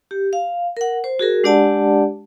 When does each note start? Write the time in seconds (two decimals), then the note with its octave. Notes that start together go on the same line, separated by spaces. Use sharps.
0.11 G4
0.33 F5
0.77 A#4 F#5
1.04 C5
1.19 F#4 G#4 A#4
1.44 G#3 D4 G4 D5 F#5 A5